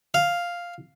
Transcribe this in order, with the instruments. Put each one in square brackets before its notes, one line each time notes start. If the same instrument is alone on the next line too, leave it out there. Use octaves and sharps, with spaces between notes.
[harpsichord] F5